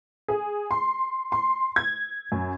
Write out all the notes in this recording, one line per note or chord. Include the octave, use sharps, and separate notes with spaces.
G#4
C6
C6
G#6
F#2